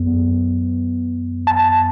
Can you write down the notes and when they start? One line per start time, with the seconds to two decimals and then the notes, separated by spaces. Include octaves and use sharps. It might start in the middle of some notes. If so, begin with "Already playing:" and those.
Already playing: F#2 B3
1.47 A5